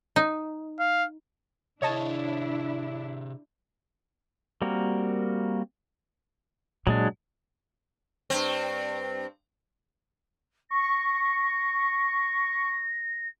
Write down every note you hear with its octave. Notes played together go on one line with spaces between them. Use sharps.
D#4
F5
C3 D4 E4 G#4 C#5 D#5 A5
G3 A#3 C4 F#4 A#4
A#2 F#3 G#3 D4
G2 C4
C#6 A#6